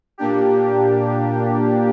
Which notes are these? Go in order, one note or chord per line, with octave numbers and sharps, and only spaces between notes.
A#2 A#3 D4 G4